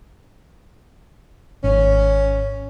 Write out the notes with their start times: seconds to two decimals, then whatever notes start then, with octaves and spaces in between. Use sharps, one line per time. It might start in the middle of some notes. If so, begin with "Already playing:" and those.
1.64 G#1 C#4